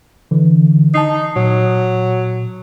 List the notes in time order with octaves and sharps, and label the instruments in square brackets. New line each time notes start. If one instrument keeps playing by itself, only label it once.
[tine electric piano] D3 E3
[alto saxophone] D#4 [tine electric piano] A5 C7
[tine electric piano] A#2 [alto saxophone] F#3